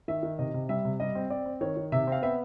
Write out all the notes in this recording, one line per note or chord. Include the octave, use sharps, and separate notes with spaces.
D#3 E5
D#3
C3 D#5
C3
G3 E5
C3
G3 D#5
C4
C4 D5
C4
D#3 C#5
D#3
C3 E5
C4 F5
B3 E5